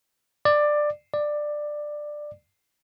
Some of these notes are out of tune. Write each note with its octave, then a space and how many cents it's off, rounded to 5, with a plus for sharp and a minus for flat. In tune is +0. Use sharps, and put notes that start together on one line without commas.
D5 +15
D5 +15